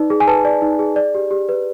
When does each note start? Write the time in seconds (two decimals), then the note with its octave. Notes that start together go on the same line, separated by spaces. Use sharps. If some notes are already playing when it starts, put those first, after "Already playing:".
Already playing: D#4 B4 D5
0.10 G#4
0.20 G#5
0.27 B4 A5
0.45 D5
0.62 D#4
0.79 G#4
0.96 D5
1.15 G4
1.31 G4
1.49 B4